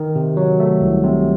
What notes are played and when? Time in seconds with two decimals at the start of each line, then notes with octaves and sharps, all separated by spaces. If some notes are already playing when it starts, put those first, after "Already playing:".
Already playing: D#3
0.16 C3
0.37 F#3
0.60 A3
0.82 C2
1.03 C3